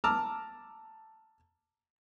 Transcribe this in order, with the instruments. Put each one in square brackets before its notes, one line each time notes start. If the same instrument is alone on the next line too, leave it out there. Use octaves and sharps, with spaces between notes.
[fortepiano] A5 A#5 D6 E6 F6